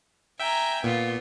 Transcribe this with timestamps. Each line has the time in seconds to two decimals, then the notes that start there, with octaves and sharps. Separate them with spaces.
0.39 E5 G5 G#5 A#5
0.84 A#2 B3 F4